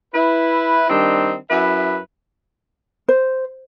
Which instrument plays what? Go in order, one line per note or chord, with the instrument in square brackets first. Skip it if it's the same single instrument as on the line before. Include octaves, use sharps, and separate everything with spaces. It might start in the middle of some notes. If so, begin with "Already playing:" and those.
[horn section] E4 B4
D#3 G3 C4 D4 D#4
F#2 E4 B4 E5
[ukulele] C5